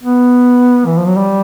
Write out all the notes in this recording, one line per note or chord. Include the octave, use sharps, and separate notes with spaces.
B3
E3
F3
F#3
G3